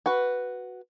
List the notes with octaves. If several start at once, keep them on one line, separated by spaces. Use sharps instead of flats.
F#4 B4